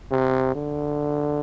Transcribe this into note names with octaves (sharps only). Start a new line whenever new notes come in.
C3
D3